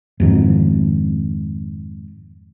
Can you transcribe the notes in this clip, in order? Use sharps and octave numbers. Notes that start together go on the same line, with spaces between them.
F2 G#2 D#3